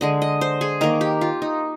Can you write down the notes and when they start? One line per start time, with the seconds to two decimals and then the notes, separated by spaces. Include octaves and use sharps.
0.01 D3 G#3 D#5
0.22 D#5
0.41 C5
0.61 G#4
0.81 D#3 A#3 A#4
1.01 G4
1.21 F4
1.42 D#4